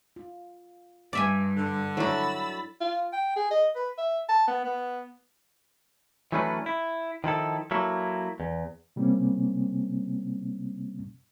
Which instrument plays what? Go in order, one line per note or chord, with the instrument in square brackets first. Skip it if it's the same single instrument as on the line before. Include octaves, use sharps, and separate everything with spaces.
[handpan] F4
[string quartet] G2 [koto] D5 E5 G#5
[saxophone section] D3
[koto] F#3 F#4 [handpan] D4 E4 A4 [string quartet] B5 E6 A6
[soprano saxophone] F4
G5
G#4
D#5
B4
E5
A5
B3
B3
[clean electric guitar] E3 F#3 A3 C#4 D4 B4
E4
D#3 F3 E4 A4
F#3 A#3 E4 A4
E2
[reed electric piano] C3 G3 A#3 C4 C#4